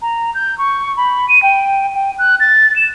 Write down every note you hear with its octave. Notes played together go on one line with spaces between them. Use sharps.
A#5
G6
C#6
B5
D#7
G5
G5
F#6
A6
E7